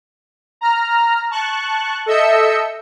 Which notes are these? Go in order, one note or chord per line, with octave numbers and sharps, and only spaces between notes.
A#5 F6
A5 C#6 F#6
A4 D#5 E5 E6 G6 C#7